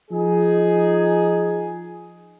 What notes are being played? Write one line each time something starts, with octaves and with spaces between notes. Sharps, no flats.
F3 D#4 G#4